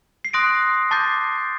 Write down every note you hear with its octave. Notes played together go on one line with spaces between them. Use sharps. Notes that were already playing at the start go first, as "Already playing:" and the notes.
C7
C6 D#6 F#6 A#6 D7
A5 D6 G6 A6 C7